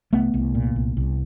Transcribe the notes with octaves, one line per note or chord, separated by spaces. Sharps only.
C2 A3 B3
C2
A#2
C2
C2